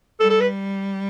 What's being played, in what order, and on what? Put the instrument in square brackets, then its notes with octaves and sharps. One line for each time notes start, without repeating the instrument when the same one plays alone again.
[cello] G3 [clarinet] A4
[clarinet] A4
B4